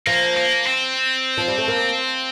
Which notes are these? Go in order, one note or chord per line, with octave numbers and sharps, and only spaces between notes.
F3 A#3
A#3
C4
F3
G3
A3
A#3